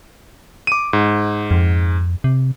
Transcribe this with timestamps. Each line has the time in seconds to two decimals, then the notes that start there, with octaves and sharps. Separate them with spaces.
0.67 D6 D#7
0.93 G#2
1.51 F2
2.24 C3